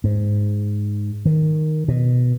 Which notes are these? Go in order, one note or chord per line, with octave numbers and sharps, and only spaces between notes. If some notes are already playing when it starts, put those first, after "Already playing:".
G#2
D#3
B2